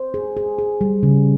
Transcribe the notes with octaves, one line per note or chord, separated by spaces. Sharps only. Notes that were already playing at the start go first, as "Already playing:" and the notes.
Already playing: C5
G#4
G#4
G#4
G3
C#3